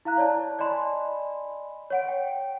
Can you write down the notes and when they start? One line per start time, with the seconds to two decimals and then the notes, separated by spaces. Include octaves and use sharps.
0.05 E4 F5 A#5 F#6
0.18 C#5 D5 A5
0.59 D5 D#5 G#5 B5 C6
1.90 C#5 F#5 D7
2.08 G5